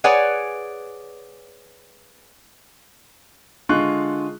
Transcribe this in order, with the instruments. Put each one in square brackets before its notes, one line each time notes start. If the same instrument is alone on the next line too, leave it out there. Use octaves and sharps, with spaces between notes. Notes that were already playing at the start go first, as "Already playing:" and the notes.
[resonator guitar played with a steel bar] G#4 B4 C#5 D5 F#5 G#5
[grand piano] D3 G#3 F4 G#4 C#6 F#6